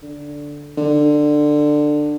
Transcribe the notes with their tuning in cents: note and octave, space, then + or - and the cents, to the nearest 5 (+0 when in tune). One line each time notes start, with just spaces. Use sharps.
D3 -5
D3 +15